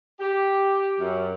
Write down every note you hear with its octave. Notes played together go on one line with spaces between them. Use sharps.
G4
F#2